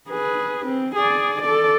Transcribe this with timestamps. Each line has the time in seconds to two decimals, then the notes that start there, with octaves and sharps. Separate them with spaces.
0.10 G#4 B4
0.66 C4
0.95 G#4 D5
1.42 A4 D5